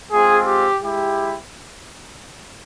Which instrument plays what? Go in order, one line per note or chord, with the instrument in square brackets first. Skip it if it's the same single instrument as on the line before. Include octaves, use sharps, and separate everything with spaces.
[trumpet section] G#3 C4 F4 G#4
G4
G#3 E4 G4